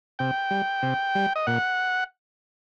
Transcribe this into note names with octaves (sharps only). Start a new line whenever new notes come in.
C3 G5
G3
C3
G3
D#5
A#2 F#5